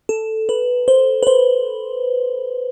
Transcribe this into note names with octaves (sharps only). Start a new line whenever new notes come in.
A4
B4
C5
B4
C5